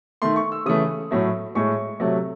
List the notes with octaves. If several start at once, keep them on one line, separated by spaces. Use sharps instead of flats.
D#3 A3 C6
C#6
E6
C#3 E3 A3 D#6
A2 F#3 A3
A2 G#3 C#6
C3 F#3 A3